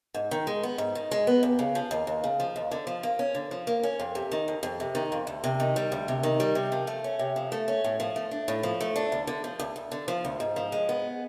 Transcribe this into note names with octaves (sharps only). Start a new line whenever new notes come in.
G#2
D#3
G#3
B3
G#2
D#3
G#3
B3
D#2
C#3
F3
D#2
D#2
C#3
F3
D#2
D3
F3
A#3
C#4
D3
F3
A#3
C#4
F2
C3
D#3
F2
F2
C3
D#3
F2
D2
C3
D#3
G3
D2
C3
D#3
G3
C3
F3
A3
C#4
C3
F3
A3
C#4
A2
F3
A3
D4
A2
F3
A3
D4
D2
D3
F3
D2
D2
D3
F3
D2
G#2
F3
G#3
B3